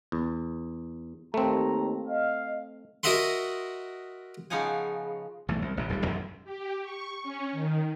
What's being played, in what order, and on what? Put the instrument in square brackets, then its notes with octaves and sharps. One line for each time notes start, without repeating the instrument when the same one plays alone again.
[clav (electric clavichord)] E2
[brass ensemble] D#2 A#5 [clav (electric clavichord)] A3 C4
[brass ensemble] D#5 F5
[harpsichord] F#4 A#4 D#5 E5 F#5 C6
[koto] C#3 F3 B3 D#4 F#5 G#5
[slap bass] B1 E3 A3
C2
A1 C3
D#1 B1 C3 G3
A1 F#2 A2 D#3
[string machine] G4
C#6
C#4
D#3